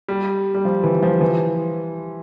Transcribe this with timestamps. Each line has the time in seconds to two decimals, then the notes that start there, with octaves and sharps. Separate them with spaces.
0.08 G3
0.54 G3
0.65 F3
0.84 E3
1.03 F3
1.21 E3